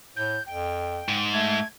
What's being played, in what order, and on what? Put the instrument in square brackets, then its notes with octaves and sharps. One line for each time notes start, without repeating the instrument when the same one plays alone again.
[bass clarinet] A2 [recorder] G6
[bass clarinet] F2 [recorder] G5
[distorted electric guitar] G#2
[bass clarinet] A3 [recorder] G#6